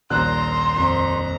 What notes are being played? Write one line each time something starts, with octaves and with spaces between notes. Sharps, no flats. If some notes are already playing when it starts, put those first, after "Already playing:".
D#1 A#1 A#5 C6 F#6
F2 A#5